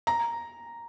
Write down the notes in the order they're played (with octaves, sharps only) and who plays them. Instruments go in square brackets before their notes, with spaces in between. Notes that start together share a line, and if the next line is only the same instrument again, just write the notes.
[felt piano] A#5